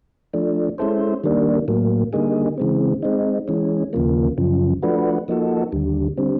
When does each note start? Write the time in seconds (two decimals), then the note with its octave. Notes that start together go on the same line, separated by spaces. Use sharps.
0.33 F3 A3 D4
0.78 G#3 C#4 E4 A4 C5
1.24 D#3 G3 A#3 D4
1.68 A2 F#3 A#3
2.13 D3 G3 A#3 D#4 G#4
2.58 C#3 E3 G#3 C4
3.03 G#3 C4 D#4
3.48 E3 G#3 C#4
3.93 D#2 C#3 F3 A#3
4.38 F#2 C#3 F3
4.82 F3 A3 D4 F#4 B4
5.28 F3 A#3 D#4 F#4 A4
5.72 D#2 D3 G3
6.17 D3 G3 C4